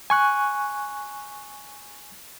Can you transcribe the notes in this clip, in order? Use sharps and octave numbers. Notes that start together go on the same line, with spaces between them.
G#5 C#6 F#6